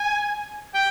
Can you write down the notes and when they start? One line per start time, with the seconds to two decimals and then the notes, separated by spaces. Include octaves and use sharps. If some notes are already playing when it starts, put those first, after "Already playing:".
Already playing: G#5
0.74 G5